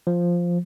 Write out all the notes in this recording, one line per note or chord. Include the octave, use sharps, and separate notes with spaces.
F3